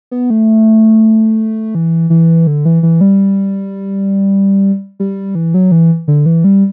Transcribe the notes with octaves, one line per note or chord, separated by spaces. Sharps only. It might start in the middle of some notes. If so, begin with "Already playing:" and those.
B3
A3
E3
E3
D3
E3
E3
G3
G3
E3
F#3
E3
D3
E3
G3